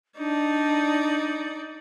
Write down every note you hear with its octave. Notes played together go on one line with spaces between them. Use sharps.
D4 D#4 D5